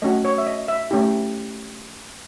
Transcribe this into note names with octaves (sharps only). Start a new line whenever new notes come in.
A3 C#4 F#4 D#5
C#5
E5
D#5
E5
A3 C#4 E4 G4